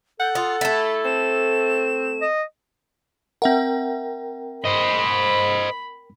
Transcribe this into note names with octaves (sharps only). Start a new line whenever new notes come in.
A4 F#5 G6
F4 D#6
A3 E4 A6
C4 E7
D#5
C4 A#4 E5 F#5 G5
C5 D#5 B5